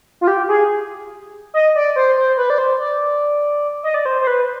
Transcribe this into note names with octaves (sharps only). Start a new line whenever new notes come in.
F4
G4
G#4
D#5
D5
C5
C5
B4
D5
C5
D5
D#5
D5
C5
C5
B4